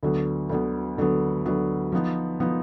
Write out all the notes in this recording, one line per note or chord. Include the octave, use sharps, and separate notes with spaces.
D2 D3 F#3 B3
D2 D3 F#3 B3
D2 D3 F#3 B3
D2 D3 F#3 B3
F3 B3 D#4
F3 B3 D#4